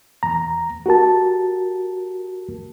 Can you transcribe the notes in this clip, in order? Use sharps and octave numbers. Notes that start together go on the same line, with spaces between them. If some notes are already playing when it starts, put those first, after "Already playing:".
E2 A#5
F#4 G4 A#4 A5